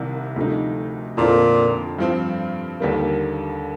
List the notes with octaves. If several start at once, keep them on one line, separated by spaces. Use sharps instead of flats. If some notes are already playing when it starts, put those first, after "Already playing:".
Already playing: C2 C3 D#3 G3 A#3
D2 C3 F3 A3 D#4
F2 A#2 D3 F3 C4 F4
G2 F3 C4
D#2 D3 G3 A#3